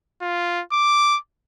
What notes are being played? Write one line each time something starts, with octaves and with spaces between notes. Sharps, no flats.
F4
D6